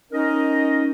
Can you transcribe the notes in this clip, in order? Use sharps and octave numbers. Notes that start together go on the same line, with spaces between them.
C#4 D#4 A#4 D#5